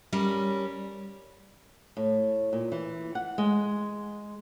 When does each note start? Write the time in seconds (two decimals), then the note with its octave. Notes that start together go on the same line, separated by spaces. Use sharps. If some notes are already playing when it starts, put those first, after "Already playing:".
0.13 G3 C#4 A#4
1.97 A2
2.53 A#2
2.72 E3
3.15 F#5
3.38 G#3